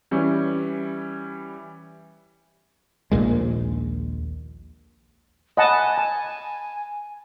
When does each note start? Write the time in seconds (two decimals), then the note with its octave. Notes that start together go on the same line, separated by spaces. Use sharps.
0.11 E3 G3 C#4
3.11 A#1 D#2 A#2 G#3
5.57 D#5 F#5 G#5 A5 B5
5.98 A5